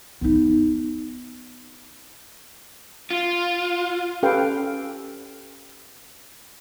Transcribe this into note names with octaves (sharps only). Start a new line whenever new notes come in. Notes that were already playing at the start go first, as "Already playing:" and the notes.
B3 D#4
F4
C#4 G4 A4 B4 F5 G5